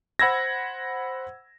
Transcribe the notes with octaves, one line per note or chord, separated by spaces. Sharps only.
C5 F#5 B5 E6 G#6 A#6